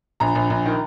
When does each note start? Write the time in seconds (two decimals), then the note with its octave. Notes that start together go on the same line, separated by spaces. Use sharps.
0.20 A#1 A#5
0.35 A#1
0.50 A#1
0.66 D#3